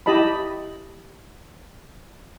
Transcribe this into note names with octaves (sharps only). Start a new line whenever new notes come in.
E4 G4 D#5 A5 B5